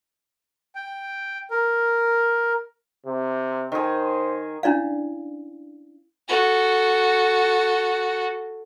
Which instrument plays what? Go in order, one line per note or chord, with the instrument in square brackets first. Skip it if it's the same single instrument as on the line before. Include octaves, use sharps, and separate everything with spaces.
[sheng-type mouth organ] G5
A#4
[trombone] C3
[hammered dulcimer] D#3 G#4 [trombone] C5
[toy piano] C#4 D4 E4 D5 F5
[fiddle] F#4 A4